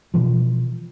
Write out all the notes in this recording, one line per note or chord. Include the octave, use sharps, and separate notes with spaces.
B2 E3 F3